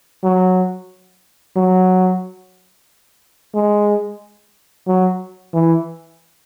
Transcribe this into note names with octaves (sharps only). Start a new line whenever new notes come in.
F#3
F#3
G#3
F#3
E3